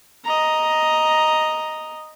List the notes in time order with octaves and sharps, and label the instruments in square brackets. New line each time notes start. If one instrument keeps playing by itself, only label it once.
[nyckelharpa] D#5 A#5